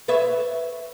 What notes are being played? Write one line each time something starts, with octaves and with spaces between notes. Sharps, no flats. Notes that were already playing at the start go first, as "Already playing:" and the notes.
B4 C#5 E5